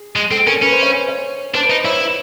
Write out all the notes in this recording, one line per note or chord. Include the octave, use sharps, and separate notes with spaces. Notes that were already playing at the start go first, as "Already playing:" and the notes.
Already playing: G#4
G#3
C4 A4
C#4 A#4
C#4 B4
C5
C#5
C5
C#5
D4 C5
B4
D#4
C5
E4 C#5
C#5